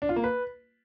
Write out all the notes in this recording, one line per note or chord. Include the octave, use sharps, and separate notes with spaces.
D4
F4
A#3
B4